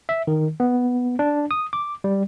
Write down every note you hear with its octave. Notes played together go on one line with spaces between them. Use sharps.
E5
D#3
B3
D4
D#6
D6
G3